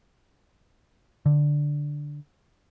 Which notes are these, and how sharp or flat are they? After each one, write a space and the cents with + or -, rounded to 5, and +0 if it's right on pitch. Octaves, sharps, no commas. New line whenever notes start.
D3 +0